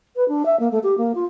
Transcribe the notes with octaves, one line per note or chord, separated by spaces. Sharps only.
B4
D4
E5
A#3
A3
G4
A#3
F4